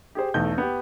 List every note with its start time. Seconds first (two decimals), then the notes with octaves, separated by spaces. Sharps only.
0.15 G4 G#4 C5
0.34 B1 E2 A3 G6
0.58 B3 G4